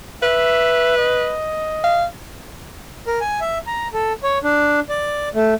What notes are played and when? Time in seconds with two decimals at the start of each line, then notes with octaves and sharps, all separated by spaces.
0.23 B4 E5
0.98 D#5
1.84 F5
3.07 A#4
3.21 G#5
3.41 E5
3.67 A#5
3.94 A4
4.23 C#5
4.43 D4
4.89 D5
5.35 A3